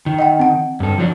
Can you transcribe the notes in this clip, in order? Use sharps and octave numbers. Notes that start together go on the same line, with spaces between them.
D#3
D#5 F#5 G5
C4 F#5
G2 A4
F3 F#3 D4